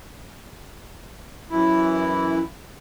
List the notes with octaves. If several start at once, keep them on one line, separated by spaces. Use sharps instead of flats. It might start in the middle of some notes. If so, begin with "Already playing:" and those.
F#2 E3 E4